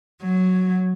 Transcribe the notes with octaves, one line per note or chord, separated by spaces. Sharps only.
F#3